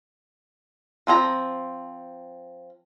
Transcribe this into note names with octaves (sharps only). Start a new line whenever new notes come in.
F3 C4 G#4 A#5